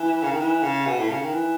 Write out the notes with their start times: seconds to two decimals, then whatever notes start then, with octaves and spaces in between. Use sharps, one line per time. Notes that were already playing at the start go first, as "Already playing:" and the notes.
Already playing: E3
0.23 C#3
0.31 D#3
0.40 E3
0.63 C#3
0.86 B2
0.98 A2
1.09 C#3
1.21 D#3
1.33 E3